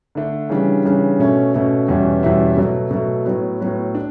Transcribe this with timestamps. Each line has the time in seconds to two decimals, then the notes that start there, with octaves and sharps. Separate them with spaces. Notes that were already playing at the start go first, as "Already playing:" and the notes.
0.15 D3 A3 D4
0.50 C#3 E3 G3 D4
0.85 C#3 E3 G3 D4
1.19 B2 A3 C#4
1.54 B2 A3 C#4
1.88 E2 B2 G3 C#4 E4
2.23 E2 B2 G3 C#4 E4
2.57 B2 F#3 A3
2.91 B2 F#3 A3
3.25 A2 F#3 B3
3.60 A2 F#3 B3
3.95 D4